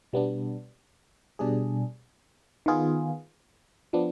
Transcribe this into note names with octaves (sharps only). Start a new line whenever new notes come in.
B2 G3 B3 D4
B2 G3 D4 G#4
D#3 B3 F4 G#4
F3 B3 D4